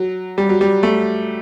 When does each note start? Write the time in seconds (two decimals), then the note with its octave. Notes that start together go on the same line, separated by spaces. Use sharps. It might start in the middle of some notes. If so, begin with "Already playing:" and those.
Already playing: F#3
0.38 G3
0.49 F#3
0.61 G3
0.83 A3